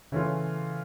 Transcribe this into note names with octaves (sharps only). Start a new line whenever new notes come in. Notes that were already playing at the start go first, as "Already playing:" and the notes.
C#3 E3 A3 C#4 F4